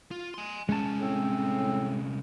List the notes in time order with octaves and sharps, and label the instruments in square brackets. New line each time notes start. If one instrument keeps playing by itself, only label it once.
[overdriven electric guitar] F4
G#5 C6
[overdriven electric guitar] C2 C#4 [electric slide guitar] G#3 A5
[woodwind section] A2 C4